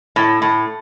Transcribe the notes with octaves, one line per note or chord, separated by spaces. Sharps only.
A2
A2